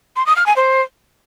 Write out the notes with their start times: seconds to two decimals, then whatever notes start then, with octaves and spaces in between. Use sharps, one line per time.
0.16 C6
0.26 D#6
0.36 F6
0.46 G#5
0.56 C5